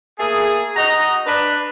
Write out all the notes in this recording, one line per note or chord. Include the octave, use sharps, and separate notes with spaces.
A3 A#3 G#4
D#4 F#4 D#5 A#5
D4 B4